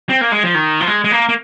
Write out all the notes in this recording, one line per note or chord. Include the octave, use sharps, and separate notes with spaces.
C4
A#3
G#3
F3
D#3
F3
G#3
G#3
A#3
A#3